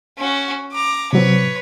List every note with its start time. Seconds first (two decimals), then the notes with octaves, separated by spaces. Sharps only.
0.18 C#4 F#4
0.72 A#5 D6
1.13 C3 F#3 C4 B4 C#5